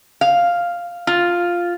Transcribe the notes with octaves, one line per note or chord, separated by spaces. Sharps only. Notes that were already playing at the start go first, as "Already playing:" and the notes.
F5
F4